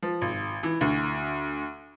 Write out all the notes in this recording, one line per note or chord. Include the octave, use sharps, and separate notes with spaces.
F3
G#1
E3
D2